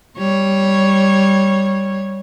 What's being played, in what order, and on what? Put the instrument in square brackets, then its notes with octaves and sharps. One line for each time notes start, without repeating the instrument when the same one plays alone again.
[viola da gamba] G3 C#5